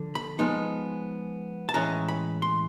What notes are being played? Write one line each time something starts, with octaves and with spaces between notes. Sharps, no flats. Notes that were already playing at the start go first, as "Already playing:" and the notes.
Already playing: D3 F3
B5
F3 G#3 B3 D#4
A5
A2 E3 G#3 C#4 A#5
B5
C6